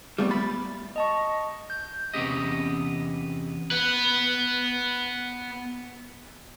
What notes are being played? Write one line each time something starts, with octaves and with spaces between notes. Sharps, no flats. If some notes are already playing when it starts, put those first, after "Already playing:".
G3 A3 B3
B5 A6
D#5 A5 C#6
G6
E2 C3 B3 C#4 G4 D#5
B3 B4